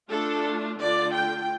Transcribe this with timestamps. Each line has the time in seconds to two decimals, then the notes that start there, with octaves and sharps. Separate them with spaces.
0.10 A3 D4 F4 A4
0.79 D3 A3 D4 F4 D5
1.14 G5